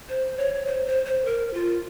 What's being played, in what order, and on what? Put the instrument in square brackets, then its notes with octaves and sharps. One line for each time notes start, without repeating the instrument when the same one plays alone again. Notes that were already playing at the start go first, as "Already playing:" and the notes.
[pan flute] C5
C#5
C5
C5
C5
A#4
F4